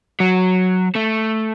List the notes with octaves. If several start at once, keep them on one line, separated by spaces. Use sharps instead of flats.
F#3
A3